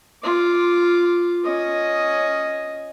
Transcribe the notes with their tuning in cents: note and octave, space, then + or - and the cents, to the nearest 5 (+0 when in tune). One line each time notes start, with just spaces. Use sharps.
F4 +0 D6 +0
C#4 +0 D#5 +0